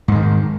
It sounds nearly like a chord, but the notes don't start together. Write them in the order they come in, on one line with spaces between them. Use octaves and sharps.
G#2 G#3 D#3